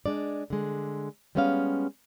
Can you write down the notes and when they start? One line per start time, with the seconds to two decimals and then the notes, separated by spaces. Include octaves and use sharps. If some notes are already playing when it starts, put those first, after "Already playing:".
0.06 G#3 D4 D5
0.50 D3 G#3
1.35 G3 G#3 B3 C#4 E5 F5